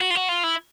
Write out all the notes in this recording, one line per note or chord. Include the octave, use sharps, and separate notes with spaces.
F#4
F4
F#4
F4
E4